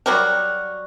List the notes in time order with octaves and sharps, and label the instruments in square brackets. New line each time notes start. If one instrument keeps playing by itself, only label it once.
[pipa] F#3 G3 F#4 A#4